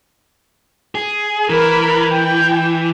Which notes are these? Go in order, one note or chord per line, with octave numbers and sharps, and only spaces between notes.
G#4
E3 A#4 B5
G5